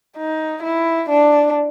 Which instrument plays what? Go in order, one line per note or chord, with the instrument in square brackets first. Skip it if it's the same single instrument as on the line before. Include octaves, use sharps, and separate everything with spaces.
[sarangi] D#4
E4
D4